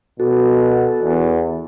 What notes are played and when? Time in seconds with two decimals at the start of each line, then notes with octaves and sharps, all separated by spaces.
0.20 B2 F#4 A4
1.02 E2